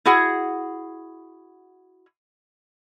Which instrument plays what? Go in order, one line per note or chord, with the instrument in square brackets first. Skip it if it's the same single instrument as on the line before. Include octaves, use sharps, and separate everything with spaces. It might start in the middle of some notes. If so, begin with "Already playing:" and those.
[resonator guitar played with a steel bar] E4 F#4 G#4 F#5